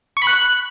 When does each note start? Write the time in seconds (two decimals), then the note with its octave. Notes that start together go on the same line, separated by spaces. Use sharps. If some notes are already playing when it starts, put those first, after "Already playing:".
0.17 C#6
0.22 B5
0.27 F#6